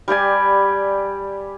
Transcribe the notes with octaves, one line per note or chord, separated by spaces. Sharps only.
G3 G4 D5 G#5